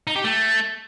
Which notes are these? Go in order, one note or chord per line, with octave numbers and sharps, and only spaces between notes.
D#4
G4
A3